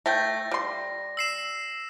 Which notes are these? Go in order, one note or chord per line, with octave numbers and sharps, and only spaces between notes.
A3 G5 A#6
G3 C6
E6 C7 E7